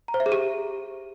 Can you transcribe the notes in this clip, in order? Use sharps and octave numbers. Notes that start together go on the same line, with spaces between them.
A#5
C5
E5
G#4
G4